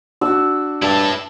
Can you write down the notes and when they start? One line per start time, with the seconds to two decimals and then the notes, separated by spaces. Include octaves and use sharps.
0.21 D4 F#4 E6
0.82 G2 E4 A5